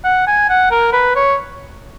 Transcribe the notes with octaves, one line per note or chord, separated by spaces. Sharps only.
F#5
G#5
F#5
A#4
B4
C#5